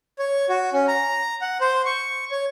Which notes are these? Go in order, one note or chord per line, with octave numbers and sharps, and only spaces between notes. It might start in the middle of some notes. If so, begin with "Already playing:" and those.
C#5
F#4
C#4
A#5
F#5
C5
C#6
C#5